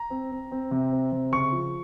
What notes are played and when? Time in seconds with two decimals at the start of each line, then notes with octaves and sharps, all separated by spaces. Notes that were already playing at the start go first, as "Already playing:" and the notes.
Already playing: A#5
0.10 C4
0.31 C4
0.52 C4
0.71 C3
0.92 C4
1.12 C3
1.32 C#3 C#6
1.52 F3